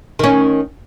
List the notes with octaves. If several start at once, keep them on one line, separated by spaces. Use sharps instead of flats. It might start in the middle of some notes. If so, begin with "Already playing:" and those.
D#3 C#4